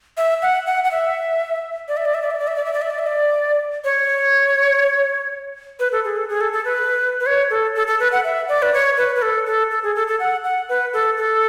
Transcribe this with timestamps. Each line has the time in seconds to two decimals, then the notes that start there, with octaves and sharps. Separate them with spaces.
0.17 E5
0.42 F#5
0.66 F#5
0.84 F#5
0.91 E5
1.88 D5
1.97 E5
2.05 D5
2.14 E5
2.22 D5
2.31 E5
2.39 D5
2.48 E5
2.56 D5
2.65 E5
2.73 D5
2.82 E5
2.90 D5
2.99 E5
3.07 D5
3.84 C#5
5.80 B4
5.92 A4
6.04 G#4
6.16 A4
6.29 G#4
6.41 A4
6.53 A4
6.65 B4
7.20 B4
7.26 C#5
7.50 A4
7.75 A4
7.87 A4
8.00 B4
8.12 F#5
8.24 E5
8.48 D5
8.62 B4
8.74 C#5
8.97 B4
9.15 B4
9.22 A4
9.46 A4
9.71 A4
9.83 G#4
9.96 A4
10.08 A4
10.20 F#5
10.44 F#5
10.69 B4
10.93 A4
11.17 A4